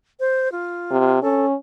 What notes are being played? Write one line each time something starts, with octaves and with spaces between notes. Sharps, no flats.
C5
F4
C3
C#4 A4